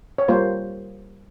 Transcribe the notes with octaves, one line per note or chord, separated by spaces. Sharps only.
C#5
G3 A#3 F4 C5